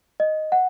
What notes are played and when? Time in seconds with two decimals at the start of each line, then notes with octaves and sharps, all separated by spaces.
0.20 D#5
0.52 F#5